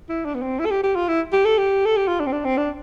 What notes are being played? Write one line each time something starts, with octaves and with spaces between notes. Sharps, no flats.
E4
D4
B3
C4
E4
A4
G4
G4
F4
E4
G4
A4
G4
A4
G4
F4
D4
C4
D4
C4
D4